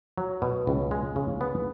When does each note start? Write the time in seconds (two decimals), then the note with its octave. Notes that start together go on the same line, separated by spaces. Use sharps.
0.17 F#3
0.42 B2
0.67 C#2
0.91 G#3
1.16 C#3
1.41 B3